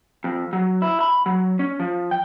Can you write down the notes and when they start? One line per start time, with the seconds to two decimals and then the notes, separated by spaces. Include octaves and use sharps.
0.24 F2
0.53 F#3
0.82 E4
1.01 B5
1.26 F#3
1.59 C#4
1.80 F3
2.11 G5